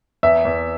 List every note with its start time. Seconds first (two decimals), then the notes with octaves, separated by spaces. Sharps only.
0.23 E2 E5
0.45 E2